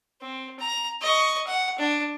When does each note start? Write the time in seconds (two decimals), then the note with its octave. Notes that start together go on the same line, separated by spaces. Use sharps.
0.21 C4
0.60 A#5
1.02 D#5 C#6
1.47 F#5
1.79 D4